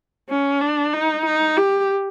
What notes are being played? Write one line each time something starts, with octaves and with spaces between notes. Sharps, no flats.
C#4
D4
D#4
D#4
G4